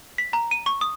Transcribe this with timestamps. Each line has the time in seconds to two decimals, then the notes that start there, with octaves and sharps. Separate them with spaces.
0.18 B6
0.33 A#5
0.51 D#7
0.66 C#6
0.81 D#6